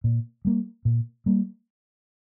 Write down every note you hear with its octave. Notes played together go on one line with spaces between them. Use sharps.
A#2
G3 A#3
A#2
G3 A#3